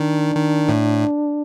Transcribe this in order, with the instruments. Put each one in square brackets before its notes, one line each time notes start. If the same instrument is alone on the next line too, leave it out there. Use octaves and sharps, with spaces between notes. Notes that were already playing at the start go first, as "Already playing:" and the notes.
Already playing: [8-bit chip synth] D#3 [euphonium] D4
[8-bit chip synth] D#3
A2